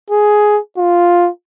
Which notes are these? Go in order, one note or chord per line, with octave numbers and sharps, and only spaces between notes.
G#4
F4